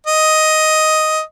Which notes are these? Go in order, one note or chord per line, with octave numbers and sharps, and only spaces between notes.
D#5